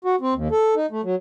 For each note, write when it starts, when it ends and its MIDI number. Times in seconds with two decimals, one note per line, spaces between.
0.04 0.15 66
0.21 0.34 60
0.34 0.48 39
0.51 0.75 69
0.76 0.86 63
0.91 1.01 57
1.04 1.15 54